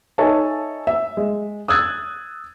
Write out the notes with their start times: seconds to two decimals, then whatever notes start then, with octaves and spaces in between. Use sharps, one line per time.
0.18 D#4 A4 C#5 E5 G#5 A5
0.87 E5
1.17 G#3
1.68 D#6 E6 F#6 G#6 A6